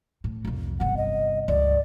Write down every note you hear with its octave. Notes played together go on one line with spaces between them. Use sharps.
A2
C2 F2
G1 C3 F#5
D#5
C#2 G2 D5